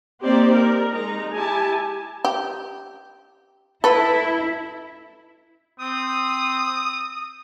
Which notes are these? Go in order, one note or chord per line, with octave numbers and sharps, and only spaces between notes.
A#3 C4 D#4 G4 C5 D5
A#4
G#3 D#4 A#5
E4 G4 G#5 A5
G4
E4 A4 B4
C4 D#6